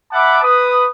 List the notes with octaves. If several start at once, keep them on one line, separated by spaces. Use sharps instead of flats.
E5 F#5 A5 B5 D6
B4 D#6